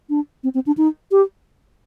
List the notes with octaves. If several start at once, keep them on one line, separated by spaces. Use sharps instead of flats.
D4
C4
C4
D4
D#4
G4